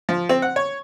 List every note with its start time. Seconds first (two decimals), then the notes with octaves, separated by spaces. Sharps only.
0.09 F3
0.29 C4
0.42 F#5
0.56 C#5